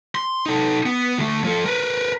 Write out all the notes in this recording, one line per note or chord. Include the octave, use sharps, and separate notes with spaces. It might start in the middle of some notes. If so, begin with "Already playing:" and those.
C6
D#4 A4
B3
D2 A3
F3 A4
A#4 B4